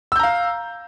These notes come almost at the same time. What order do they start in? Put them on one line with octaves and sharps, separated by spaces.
E6 G6 A#5 F5